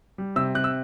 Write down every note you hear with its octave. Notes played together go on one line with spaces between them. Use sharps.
G3
C3 E6
C3 F#6
E6